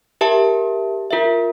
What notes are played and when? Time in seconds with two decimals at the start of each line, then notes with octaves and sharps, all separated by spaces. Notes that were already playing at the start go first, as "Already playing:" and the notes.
0.21 G4 A#4 E5 A5
1.11 F4 A#4 E5